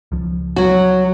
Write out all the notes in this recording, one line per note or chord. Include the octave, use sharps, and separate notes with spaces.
C#2 F3
F#3 F#4